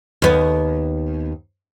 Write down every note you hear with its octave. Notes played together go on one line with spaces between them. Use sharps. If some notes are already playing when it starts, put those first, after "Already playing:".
D#2 B3